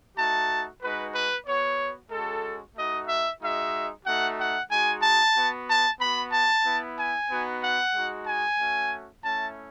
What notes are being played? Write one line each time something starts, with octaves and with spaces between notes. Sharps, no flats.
A3 D#4 F#4 A5
G#3 D#4 F#4 B4
B4
B3 F#4 C#5
G#3 C#4 F#4 A4
A3 D#4 F#4 D#5
E5
G#3 D#4 F#4 E5
A3 D#4 F#4 F#5
F#5
G#3 D#4 F#4 G#5
A5
B3 F#4
A5
B3 F#4 B5
A5
B3 E4
G#5
B3 D#4 F#4
F#5
G#3 D#4 F#4
G#5
A3 C#4 F#4
A3 C#4 E4 A5